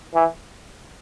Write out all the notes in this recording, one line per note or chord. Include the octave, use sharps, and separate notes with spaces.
E3